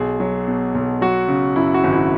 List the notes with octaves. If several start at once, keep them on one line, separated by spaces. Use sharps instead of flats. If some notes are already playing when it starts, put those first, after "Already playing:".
Already playing: B1 G#4
F#3
B2
B1
F#3 F#4
C#3
F#2 E4
F#4
G#1
E4